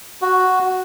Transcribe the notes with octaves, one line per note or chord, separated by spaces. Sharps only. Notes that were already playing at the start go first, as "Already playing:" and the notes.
F#4